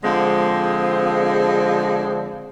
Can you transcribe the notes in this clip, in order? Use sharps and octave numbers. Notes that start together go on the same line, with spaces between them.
D3 F3 G#3 C4